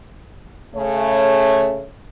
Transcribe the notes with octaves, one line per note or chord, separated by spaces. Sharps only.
C#3 A3 C#5